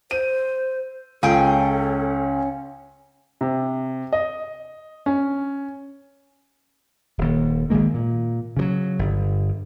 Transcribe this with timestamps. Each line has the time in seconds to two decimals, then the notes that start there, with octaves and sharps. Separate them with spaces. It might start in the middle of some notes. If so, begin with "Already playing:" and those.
0.11 C5 D#7
1.23 C#2 C#4 G#4 A4 G5
3.41 C3
4.13 D#5
5.06 C#4
7.18 D#1 D#2
7.70 G#1 D#3 G#3 A#3
7.94 A#2
8.57 C#3 E3 F#3
8.99 G1